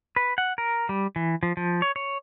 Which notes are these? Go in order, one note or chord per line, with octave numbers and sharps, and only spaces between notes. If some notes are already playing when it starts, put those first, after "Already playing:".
B4
F#5
A#4
G3
E3
F3
F3
C#5
C#5